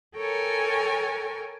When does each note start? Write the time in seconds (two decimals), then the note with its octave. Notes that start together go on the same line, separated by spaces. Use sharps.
0.16 A4 A#4 C#5 G5 G#5